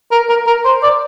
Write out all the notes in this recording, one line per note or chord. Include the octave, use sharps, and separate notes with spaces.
A#4
A#4
A#4
C5
D5